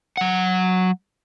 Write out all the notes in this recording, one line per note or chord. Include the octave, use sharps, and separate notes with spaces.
F#3 F#5